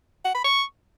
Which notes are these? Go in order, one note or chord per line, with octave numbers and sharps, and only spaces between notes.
F#5
B5
C#6